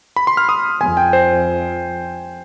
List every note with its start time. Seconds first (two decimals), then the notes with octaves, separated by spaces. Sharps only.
0.16 B5
0.27 C6
0.37 F6
0.49 D#6
0.81 F2 G#5
0.97 G5
1.13 C5